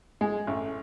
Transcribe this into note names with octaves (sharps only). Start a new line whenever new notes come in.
G#3
A1